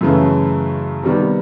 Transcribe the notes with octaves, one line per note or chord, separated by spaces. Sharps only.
F#2 C#3 E3 A3
C3 D#3 G3 B3